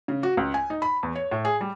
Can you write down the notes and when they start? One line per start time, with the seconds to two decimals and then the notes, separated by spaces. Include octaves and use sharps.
0.08 C#3
0.23 F#4
0.37 C#2
0.54 G#5
0.70 D#4
0.82 B5
1.03 E2
1.15 C#5
1.31 A2
1.45 G#4
1.61 G3